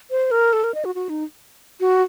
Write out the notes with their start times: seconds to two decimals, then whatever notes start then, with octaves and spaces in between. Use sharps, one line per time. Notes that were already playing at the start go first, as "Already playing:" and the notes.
0.11 C5
0.31 A#4
0.53 A4
0.64 A#4
0.74 D#5
0.85 F#4
0.95 F#4
1.09 D#4
1.80 F#4